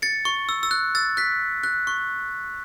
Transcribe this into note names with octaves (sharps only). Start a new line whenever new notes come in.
A6 C#7
C#6
E6
E6
F#6
E6 A6
F#6 B6
F#6
C#6